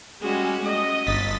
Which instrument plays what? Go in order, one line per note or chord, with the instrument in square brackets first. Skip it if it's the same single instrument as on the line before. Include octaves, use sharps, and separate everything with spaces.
[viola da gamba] G3 C#4 F#4 [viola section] G#3
[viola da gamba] A3 [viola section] D#5
[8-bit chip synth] G1 A6 B6